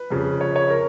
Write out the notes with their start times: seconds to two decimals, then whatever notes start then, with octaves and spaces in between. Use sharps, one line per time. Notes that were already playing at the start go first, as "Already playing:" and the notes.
Already playing: B4
0.10 F2 C#3 F3
0.41 C#5
0.56 C#5
0.70 A#4